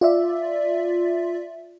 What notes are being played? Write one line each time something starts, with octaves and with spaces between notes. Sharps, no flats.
F4 D5 E5